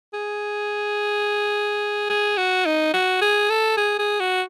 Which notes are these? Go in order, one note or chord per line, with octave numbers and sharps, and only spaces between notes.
G#4
G#4
F#4
D#4
F#4
G#4
A4
G#4
G#4
F#4